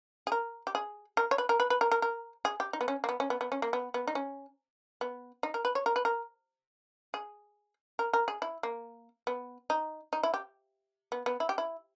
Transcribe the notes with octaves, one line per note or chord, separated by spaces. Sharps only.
G#4
A#4
G4
G#4
A#4
C#5
B4
A#4
B4
B4
A#4
A#4
A#4
G#4
G4
D#4
B3
C#4
A#3
B3
C#4
B3
B3
C#4
A#3
B3
B3
D#4
C#4
B3
D#4
A#4
B4
C#5
A#4
B4
A#4
G#4
A#4
A#4
G#4
E4
A#3
B3
D#4
D#4
E4
G4
B3
B3
E4
G4
E4